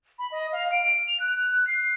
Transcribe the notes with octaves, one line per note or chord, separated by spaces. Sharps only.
B5
D#5
F5
D7
F7
F#6
C7